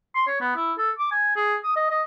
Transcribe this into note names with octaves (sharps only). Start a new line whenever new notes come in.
C6
C#5
B3
E4
A4
D6
G#5
G#4
D#6
D#5
D#5